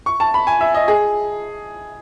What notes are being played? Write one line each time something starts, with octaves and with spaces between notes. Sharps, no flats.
C#6
A5
B5
G#5
E5
D#5
G#4